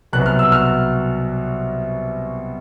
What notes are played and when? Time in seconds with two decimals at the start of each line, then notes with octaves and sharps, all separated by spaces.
0.13 C2 B2 F#3 F#6
0.26 F6
0.39 E6
0.52 F6